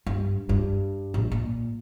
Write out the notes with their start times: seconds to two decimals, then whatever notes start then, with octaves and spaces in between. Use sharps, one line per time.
0.07 G2
0.49 G2
1.14 A#1
1.32 A#2